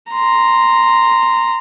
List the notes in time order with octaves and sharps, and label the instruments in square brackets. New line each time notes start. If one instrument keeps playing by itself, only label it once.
[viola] A#5 C6